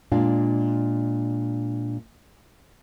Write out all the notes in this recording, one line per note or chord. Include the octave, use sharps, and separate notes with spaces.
A#2 G#3 D4 F5